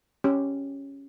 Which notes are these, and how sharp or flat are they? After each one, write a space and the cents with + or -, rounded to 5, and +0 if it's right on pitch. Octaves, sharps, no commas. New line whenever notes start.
C#4 +0 G4 +0